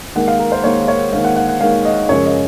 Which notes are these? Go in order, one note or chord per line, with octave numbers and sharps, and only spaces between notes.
D#2 D#3 G#3 F#5
F5
A#4
C5
D#2 D#3 G#3 C#5
C#5
D#2 D#3 G#3 F5
F#5
F#5
F#5
D#2 D#3 G#3 F5
D#5
F#2 C#3 F3 G#3 C#5
D#5